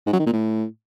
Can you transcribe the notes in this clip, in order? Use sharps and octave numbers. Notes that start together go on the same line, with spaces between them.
G#2
F#3
D#3
A#2
A2